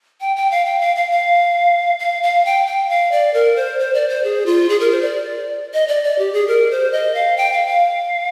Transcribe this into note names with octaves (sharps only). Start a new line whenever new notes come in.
G5
G5
F5
G5
F5
F5
F5
F5
F5
G5
G5
F5
D5
A#4
C5
C5
D5
C5
G#4
F4
G#4
A#4
C5
D5
D#5
D5
D5
G4
G#4
A#4
C5
D#5
F5
G5
F5
F5